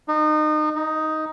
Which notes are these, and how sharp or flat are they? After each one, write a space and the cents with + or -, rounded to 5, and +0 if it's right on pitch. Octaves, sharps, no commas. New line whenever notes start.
D#4 -30
D#4 +5